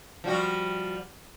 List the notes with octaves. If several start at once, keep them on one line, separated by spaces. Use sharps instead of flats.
F3 G3 F#4